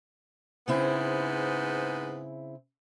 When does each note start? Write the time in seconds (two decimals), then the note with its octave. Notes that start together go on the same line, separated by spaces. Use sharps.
0.68 G#2 C#3 B3 C4 E4 C5